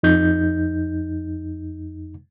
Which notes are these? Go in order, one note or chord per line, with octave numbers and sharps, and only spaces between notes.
F2 D#4 G6